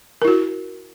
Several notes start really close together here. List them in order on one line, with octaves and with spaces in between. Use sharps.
A#4 E4 F#4